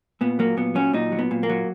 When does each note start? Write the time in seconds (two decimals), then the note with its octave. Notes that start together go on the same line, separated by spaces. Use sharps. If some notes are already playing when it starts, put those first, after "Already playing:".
0.21 A#2 B3
0.39 F#3 A#3
0.57 A#2 B3
0.75 F#3 C#4
0.93 A#2 D#4
1.12 F#3
1.19 B3
1.31 A#2
1.43 A#3
1.49 F#3